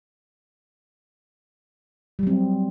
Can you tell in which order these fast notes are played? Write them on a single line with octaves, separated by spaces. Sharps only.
G3 F#3 C4